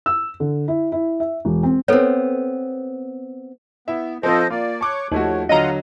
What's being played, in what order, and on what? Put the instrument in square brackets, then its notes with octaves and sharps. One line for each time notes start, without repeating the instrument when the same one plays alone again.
[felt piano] E6
D3
E4
E4
E5
E1
C4
[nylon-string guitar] B3 C4 [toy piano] A4 B4 C#5
[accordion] B3 [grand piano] E4 E5
[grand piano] F3 C4 F4 [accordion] A4 C5 D#5
[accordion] A#3 D5 [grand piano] F4
[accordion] C#5 C#6 [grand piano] A5 D6 F#6
[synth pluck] D#2 [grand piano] F3 A3 F#4 [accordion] C#5
[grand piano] D3 F#3 [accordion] F4 F5 F#5 [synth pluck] D#5 A#5